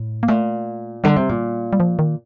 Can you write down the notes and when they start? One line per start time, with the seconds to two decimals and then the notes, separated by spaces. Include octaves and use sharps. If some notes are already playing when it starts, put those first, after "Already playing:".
Already playing: A2
0.23 A#3
0.28 A#2 A3
1.04 D3 G3
1.16 C3
1.29 A#2
1.73 G3
1.80 F3
1.99 D#3